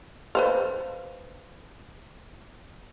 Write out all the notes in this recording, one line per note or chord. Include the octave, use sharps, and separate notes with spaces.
B4 C5 F5